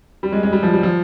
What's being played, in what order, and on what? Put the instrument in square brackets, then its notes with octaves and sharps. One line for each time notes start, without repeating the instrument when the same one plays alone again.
[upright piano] G3
G#3
G#3
G3
F3
G3
F3